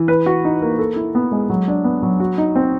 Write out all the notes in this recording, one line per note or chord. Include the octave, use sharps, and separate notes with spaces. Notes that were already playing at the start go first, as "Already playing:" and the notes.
Already playing: E3
B4
F#4
D#4
A#3
A4
E4
B3
G#3
F#3
D4
B3
F#3
F#4
D#4
C4